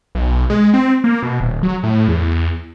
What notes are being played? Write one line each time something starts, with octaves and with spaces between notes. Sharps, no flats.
B1
G#3
C4
A#3
B2
D#1
F#3
A2
E2